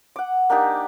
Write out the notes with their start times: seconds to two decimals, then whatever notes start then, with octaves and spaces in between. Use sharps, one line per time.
0.16 F#5 D6
0.50 A#3 D4 D#4 G4